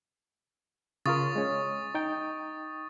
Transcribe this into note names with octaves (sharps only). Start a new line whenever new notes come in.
C#3 F4 A#4 C#6 D#6 A6
G#3 C#4
D#4 G5